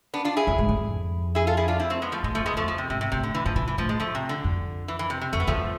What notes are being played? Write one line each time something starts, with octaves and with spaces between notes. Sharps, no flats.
B3 D4
D4 F4
E4 G#4
F2
G#2
F2
E4 G#4
F4 A4
E4 G#4
D4 F4
C4 E4
A3 C4
G#3 B3
F3 A3
A2 G#3
F2 F3 A3
G#3 B3
F2 F3 A3
F3
C3
G#2 C3
C3
A2 C3
D3
E3
A2 F3
B2 E3
E3
A2 F3
G#3
F3 A3
C3
D3
F2
E3
E3
C3
C3
F2 A3
B3
E2 F3 A3